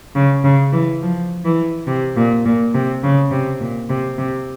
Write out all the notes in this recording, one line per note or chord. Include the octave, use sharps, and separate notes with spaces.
C#3
C#3
E3
F3
E3
C3
A#2
A#2
C3
C#3
C3
A#2
C3
C3